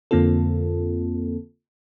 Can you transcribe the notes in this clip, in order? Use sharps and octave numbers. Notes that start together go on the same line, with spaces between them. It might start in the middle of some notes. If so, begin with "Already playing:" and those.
F2 D3 A#3 C4 F4 A4